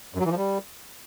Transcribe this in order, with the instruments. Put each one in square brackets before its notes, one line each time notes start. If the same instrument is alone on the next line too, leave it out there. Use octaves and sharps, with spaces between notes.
[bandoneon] F#2
F#3
E3
F3
G3